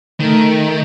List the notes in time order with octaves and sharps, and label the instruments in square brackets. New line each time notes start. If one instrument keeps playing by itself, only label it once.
[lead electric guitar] D#3 [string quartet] A3